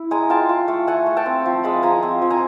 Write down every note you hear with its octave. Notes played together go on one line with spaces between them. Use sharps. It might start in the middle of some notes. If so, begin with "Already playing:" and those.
Already playing: E4
G#3 G#5 A#5
F4 G5 A5
F4
A3
A3 F#5 G#5
A3
G5 A5
C4
F3
G#3 A5 B5
F3 G#5 A#5
C4
F3
G#5 A#5